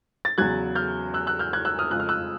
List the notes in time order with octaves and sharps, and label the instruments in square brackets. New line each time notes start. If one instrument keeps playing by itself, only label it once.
[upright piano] A6
E2 C#3 F#3 F#6 G#6
F6 G6
E6 F#6
E6 F#6
F6 G6
F#6 G#6
E6 F#6
D#6 F6
F2 C#3 F3 G#3 F#6
F6
E6 F#6